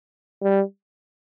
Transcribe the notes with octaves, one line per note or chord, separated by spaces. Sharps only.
G3